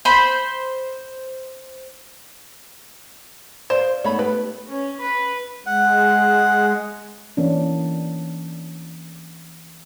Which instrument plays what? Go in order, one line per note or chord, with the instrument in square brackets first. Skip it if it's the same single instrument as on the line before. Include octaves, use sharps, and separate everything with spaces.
[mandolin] C5 B5
[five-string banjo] C5 [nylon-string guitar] D5 E5 F5
[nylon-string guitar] A3 B3 D#4 [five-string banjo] C#5 F#5 B5
[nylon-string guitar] A3 G4 [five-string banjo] B4
[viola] C#4
B4
[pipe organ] G#3 [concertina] F#5
[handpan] E3 A#3 C#4 D4